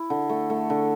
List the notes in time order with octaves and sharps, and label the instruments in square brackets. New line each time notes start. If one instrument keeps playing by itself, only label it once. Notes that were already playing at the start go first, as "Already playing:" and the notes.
Already playing: [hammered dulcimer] E4
D3
A3
A3
D3